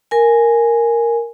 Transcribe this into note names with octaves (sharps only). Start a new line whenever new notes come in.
A#4 G#5